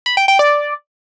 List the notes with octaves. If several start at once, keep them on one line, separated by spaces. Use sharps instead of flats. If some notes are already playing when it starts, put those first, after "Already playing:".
B5
G5
G5
D5